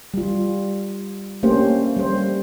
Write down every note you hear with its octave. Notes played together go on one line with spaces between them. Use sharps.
G3 F4
A3 A#3 C#4 D4 G4 C5
G3 C5